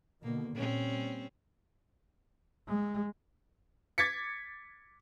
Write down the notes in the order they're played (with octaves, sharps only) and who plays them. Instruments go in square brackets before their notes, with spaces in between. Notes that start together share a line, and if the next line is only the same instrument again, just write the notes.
[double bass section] B2 D3 D#3 [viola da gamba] A#3
[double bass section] A#2 G3 [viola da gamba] C4 C#4
[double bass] G#3
[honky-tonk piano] D6 G#6 A6 B6 C#7